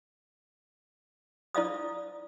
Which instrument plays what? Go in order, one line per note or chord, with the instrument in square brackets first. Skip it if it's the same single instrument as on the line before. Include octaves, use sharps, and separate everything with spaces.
[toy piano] E4 D5 F5 D#6